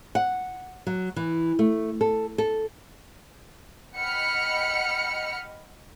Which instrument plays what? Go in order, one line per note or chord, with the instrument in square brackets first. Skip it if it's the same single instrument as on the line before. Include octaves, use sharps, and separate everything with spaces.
[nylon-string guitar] F#5
F#3
E3
A3
A4
A4
[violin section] D#5 F#5 G5 B5 F6 C#7